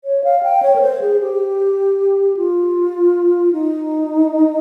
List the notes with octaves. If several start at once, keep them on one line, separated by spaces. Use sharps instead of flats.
C#5
F5
G5
C#5
A#4
C5
G#4
G4
F4
D#4